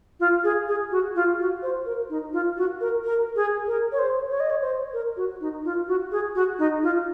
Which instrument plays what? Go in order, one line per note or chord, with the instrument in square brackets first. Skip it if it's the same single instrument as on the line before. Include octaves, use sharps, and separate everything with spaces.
[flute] F4
G#4
G#4
F#4
F4
F#4
C5
A#4
D#4
F4
F#4
A#4
A#4
G#4
A#4
C#5
C5
C#5
D#5
C#5
C5
A#4
F#4
D#4
F4
F#4
G#4
F#4
D#4
F4